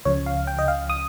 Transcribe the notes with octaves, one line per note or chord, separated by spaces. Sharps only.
C#2 C#3 F3 C#5
F5
G5
D#5
F5
D#6